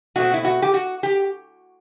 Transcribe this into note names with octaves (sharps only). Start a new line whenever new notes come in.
B2 A3 C4 F#4
E4
F#4
G4
F#4
G4